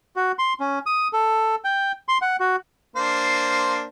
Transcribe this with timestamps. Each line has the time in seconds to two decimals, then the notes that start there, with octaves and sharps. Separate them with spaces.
0.16 F#4
0.39 C6
0.60 C#4
0.86 D#6
1.13 A4
1.64 G5
2.08 C6
2.22 F#5
2.40 F#4
2.96 A#3 D4 C5